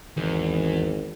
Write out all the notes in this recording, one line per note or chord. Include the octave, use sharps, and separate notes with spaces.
G#1 E2